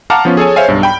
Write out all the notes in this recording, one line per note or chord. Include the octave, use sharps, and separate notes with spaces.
F5 F#5 A5 A#5 D6 F6
F3 B3 C#4 F4
G#4 A4 C#5 G#5
C5 C#5 E5 F5 G#5
B1 G2
G5 B5